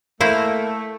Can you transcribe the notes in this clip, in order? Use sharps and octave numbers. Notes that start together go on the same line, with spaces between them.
A3 A#3 E4 C5